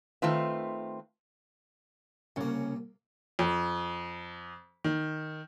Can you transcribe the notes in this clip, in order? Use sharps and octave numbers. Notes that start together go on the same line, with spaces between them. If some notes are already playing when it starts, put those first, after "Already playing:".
D#3 A3 C4 F4 B4 E5
C2 C#3 A#3 C#4 F#5
F2
D#3